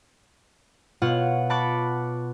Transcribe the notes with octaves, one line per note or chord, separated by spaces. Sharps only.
B2 F4 C#5 F#5 F#6
A5 B5 C#6 D6 F#6 A6